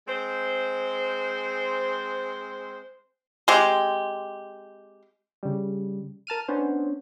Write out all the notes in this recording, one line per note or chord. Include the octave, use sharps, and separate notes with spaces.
G#3 C4 C5
G#3 C4 G4
C#3 G3
A#4 A5 F6 D#7
B3 C#4 D4 C5